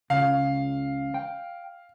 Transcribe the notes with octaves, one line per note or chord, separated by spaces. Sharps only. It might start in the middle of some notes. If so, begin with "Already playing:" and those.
C#2 C#3 F5
G5